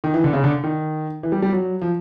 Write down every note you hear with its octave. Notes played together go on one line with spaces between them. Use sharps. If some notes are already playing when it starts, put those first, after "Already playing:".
D#3
E3
D3
C#3
D3
D#3
E3
G3
G3
F#3
F3